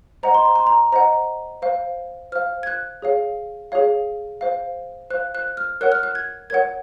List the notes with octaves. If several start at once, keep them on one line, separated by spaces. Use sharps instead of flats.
C5 D#5 F#5 A#5
C6
A#5
C6
A#5
C5 D#5 F#5 A#5
C5 F5
C5 F5 F6
G#6
F#6
G#4 C#5 F5
G#4 C#5 F5
C5 F5
C5 F5 F#6
F#6
F6
A#4 C#5 F#5 F#6
F6
F#6
G#6
A#4 C#5 F#5 G#6